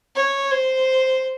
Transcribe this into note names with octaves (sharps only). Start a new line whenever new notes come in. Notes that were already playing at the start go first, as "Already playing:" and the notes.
C#5
C5